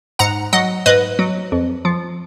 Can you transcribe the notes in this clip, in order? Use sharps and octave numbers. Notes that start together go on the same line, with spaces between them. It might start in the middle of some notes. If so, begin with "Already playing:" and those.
G#2 F#5 A#5
F#3 D#5 F#5
G#2 B4 D#5
F#3
F2
F3